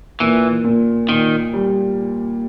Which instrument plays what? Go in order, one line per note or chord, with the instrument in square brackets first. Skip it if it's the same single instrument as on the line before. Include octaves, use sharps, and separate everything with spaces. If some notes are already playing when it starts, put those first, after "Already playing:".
[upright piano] A#2 [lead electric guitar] E3
[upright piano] A#2
[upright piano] A#2 [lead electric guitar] D#3
[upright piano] G3